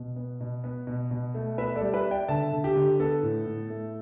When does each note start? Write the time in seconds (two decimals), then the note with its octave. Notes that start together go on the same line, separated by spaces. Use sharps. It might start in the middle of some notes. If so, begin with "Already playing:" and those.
Already playing: B2
0.16 B3
0.41 B2
0.64 B3
0.87 B2
1.11 B2
1.34 A3
1.58 B3 B4 E5
1.75 A4 D5
1.81 G3
1.93 B4 E5
2.05 B3
2.11 D5 G5
2.28 D3 E5 A5
2.52 D3
2.64 G4
2.76 D3
2.99 B3 A4
3.23 A2
3.46 A2
3.70 A3